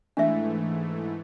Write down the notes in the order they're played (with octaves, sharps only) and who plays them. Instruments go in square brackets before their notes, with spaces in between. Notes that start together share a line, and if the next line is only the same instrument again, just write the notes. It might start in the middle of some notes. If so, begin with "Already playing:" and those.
[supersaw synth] G#2 E3 A3 [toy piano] D4 E5